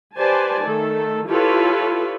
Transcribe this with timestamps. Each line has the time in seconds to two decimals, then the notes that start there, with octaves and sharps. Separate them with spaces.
0.16 G4 B4 C5 D5 G#5 A5
0.62 D#3 A3 A4
1.27 E4 F4 G4 A4 B4 C#5